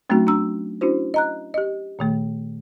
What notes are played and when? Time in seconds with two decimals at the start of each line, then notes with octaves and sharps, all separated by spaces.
0.10 F#3 A3 C4 C#4 D#4 F#4
0.27 D4 A#5 C6 E6
0.81 C#4 D4 E4 F#4 C5
1.14 D#5 A#5 F#6
1.54 G4 D#5
1.99 A#2 D#3 A3